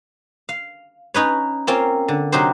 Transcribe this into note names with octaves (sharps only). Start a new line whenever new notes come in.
F5
C#4 D#4 B4 C#5
A#3 C4 C#4 F4
D3
C3 F#3 D#4 F#4 G4 C5